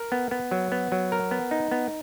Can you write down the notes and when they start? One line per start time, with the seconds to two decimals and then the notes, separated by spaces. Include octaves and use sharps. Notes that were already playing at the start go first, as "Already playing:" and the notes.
Already playing: A#4
0.12 B3
0.31 B3
0.51 F#3
0.72 B3
0.92 F#3
1.12 A#4
1.31 B3
1.51 D#4
1.71 B3